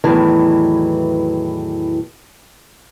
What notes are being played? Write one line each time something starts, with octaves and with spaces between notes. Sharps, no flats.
E2 A2 D#3 E3 F#3